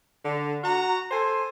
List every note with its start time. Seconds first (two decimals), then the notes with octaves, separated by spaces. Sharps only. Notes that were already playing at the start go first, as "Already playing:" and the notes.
0.24 D3
0.64 F#4 A#5
1.11 A4 C5 G#5 C6